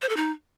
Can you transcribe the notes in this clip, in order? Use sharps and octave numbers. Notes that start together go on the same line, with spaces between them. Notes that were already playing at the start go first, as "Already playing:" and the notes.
C5
A4
D#4